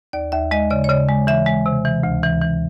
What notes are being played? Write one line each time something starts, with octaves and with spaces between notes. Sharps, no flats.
D#2 D5
D#2 E5
G#3 D#5
C#3 D5
C#5
C#3 D5
G#3
E3 E5
G#3
C3
E3
D2
E3
E3